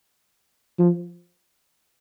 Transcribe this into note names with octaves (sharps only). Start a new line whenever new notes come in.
F3